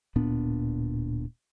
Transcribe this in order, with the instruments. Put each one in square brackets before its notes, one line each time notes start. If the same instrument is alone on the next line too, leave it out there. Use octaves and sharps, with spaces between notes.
[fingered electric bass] D1 A#2 B3 D4